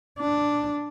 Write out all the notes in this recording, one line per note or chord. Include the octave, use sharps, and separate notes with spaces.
D4